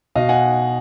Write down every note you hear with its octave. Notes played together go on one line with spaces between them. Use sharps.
B2 D#5 F5
F#5 G#5